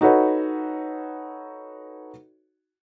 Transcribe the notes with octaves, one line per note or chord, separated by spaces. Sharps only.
D#4 F#4 A4 B4 C#5